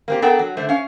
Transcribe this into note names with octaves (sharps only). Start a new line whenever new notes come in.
A#3 C4 G4
B3 D4 A4 A#4 F#5 G5
F#3
D3 A3 C5
C#4 F5